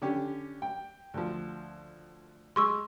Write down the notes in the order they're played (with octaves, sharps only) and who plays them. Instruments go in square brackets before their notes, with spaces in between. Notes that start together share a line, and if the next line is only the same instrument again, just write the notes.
[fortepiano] D3 C#4 G4
G5
D2 F3
[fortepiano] G#3 [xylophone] C6 C#6 E6